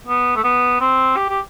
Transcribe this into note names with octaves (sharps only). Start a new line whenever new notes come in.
B3
A3
B3
C4
G4
G4